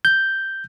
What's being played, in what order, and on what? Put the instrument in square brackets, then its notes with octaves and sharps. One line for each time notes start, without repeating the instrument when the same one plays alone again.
[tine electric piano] G6